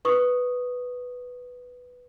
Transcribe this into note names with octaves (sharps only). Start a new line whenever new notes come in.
B4 C#6 D#6